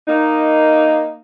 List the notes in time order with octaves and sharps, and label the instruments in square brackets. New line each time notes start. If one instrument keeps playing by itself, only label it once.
[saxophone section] A#3 D#4